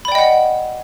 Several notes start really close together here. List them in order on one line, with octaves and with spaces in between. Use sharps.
B5 D5 G5 D#5 F#5